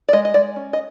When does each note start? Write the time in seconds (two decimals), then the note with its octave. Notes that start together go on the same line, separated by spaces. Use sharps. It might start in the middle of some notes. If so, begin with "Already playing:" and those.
0.08 D5
0.13 G#3 D#5
0.25 D#5
0.34 G#3 D5
0.56 C#4
0.73 D#5